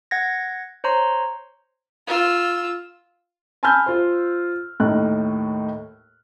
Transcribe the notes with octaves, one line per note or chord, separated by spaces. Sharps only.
F#5 G#6 A#6
C5 C#5 A#5 C6
F4 E6
G#5 A5 B5 E6 F6 G6
F4 C5
D#2 A2 D#4 F#6